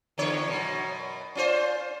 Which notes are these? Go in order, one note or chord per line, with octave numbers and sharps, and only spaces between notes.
E2 D3 C#5
F#2 B2
C#4 F4 C5